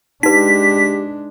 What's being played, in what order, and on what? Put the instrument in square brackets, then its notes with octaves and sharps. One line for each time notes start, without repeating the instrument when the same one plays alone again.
[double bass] G#3 D4 [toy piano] D#4 B4 [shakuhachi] G4 [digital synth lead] B6